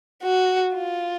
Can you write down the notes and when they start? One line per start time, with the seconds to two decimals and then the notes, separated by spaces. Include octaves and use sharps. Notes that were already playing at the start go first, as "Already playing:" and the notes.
0.23 F#4
0.75 F4